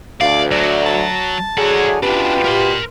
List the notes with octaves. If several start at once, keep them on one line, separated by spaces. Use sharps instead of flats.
D2 D5 F5
F#3 D5
A5
D3 F#3 E4 G#4 F#5
B2 C#4 D4 F4 G4 B4
A#4 C6